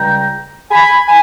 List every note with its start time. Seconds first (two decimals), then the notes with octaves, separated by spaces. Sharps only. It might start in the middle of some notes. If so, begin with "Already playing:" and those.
Already playing: C#2 C#3 G3 G5 A#5
0.70 G#5 B5
1.07 G#5 B5